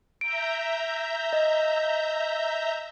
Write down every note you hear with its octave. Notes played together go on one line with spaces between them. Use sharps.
E5 A#5 G6 D7
D#5